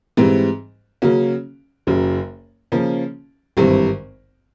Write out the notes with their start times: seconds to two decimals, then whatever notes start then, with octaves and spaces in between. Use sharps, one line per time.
0.17 G#2 E3 G3 C4
1.02 C#3 F#3 A#3 C#4 F#4
1.87 F#1 F#2 C#3 F#3
2.72 C#3 F3 A#3 C#4
3.57 G#1 G2 E3 G3 C4